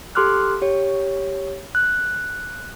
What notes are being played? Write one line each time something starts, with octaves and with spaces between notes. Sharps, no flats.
G4 A4 C6 D6 F6 F#6
G4 C#5
F#6